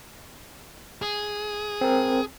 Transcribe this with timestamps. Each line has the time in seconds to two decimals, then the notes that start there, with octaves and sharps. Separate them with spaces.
1.02 G#4
1.81 C4 A#4